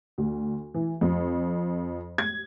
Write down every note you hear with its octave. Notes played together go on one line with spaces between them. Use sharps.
D2
E3
F2
G#6